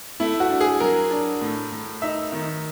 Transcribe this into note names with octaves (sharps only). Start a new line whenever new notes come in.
A3 E4
F#4
D4
G#4
F#3 A#4
D4
A2
A2
D#4 E5
D#3